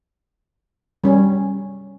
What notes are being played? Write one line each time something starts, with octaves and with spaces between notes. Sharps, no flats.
G3 C#4